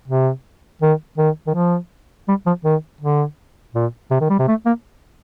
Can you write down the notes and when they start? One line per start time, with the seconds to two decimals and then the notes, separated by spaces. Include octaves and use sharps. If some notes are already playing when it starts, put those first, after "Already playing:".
0.08 C3
0.82 D#3
1.18 D#3
1.47 D#3
1.54 F3
2.28 G3
2.46 F3
2.64 D#3
3.01 D3
3.75 A#2
4.11 C3
4.20 D#3
4.30 G3
4.39 C3
4.48 A3
4.66 A#3